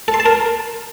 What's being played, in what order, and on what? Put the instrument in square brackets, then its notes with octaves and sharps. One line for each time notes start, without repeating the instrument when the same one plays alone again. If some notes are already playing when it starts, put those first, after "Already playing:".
[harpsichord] A4
C6
A5
A#4